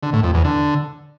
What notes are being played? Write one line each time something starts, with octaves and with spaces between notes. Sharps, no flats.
D3
A2
F2
E2
D3